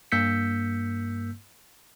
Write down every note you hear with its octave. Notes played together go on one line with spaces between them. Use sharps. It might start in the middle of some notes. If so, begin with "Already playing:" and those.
G2 A#3 E6 G6 B6 C#7